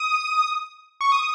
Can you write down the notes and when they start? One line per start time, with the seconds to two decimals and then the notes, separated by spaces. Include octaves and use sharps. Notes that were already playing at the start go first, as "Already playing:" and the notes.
Already playing: D#6
1.01 C#6
1.12 D#6